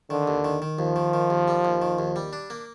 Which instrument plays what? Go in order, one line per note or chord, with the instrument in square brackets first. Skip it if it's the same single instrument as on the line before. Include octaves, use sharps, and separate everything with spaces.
[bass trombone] D3 [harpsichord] D#3
[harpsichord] D#2
D#3
D#3
[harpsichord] D#2 [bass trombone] F3
[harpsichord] D#3
D#3
D#2
G3
D#2
D#3
D#2
G3
D4
A#3